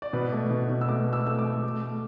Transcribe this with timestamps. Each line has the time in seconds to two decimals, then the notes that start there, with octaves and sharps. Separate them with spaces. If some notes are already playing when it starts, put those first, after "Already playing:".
0.02 D5
0.13 B2 B4
0.32 A3
0.50 B2
0.69 B2
0.81 E6
0.88 A3 D6
1.07 A3
1.13 E6
1.26 A3 E6
1.39 D6
1.45 A3
1.63 A3
1.82 A3